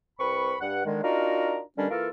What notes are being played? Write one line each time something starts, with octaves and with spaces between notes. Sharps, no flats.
C2 C4 B4 B5 C#6
G2 F#5
D3 D#3 G#3
D4 D#4 F4 F#4 A#4 A#5
G2 D3 D#3 G3 C#4 D4
E3 A#3 F4 A4 A#4